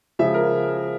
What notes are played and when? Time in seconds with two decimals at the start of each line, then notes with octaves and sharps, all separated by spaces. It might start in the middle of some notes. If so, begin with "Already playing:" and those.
0.19 C#3 F3 G#3 E5
0.34 A#4